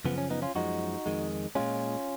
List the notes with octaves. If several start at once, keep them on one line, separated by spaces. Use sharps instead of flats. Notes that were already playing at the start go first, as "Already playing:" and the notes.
F#2 C#3 F3 B3
C#4
B3 D#4
C#4 F4
F#2 F3 G#3 D#4 F#4
F2 D#3 G#3
A#2 G#3 C#4 F4